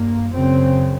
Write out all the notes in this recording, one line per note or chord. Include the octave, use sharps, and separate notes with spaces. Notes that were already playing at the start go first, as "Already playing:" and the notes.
Already playing: G2 A#3
F#2 C#3 C4